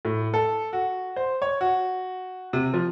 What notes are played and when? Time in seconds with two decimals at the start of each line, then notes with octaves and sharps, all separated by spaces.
0.05 A2
0.34 A4
0.73 F#4
1.16 C5
1.42 C#5
1.61 F#4
2.53 C3
2.74 F3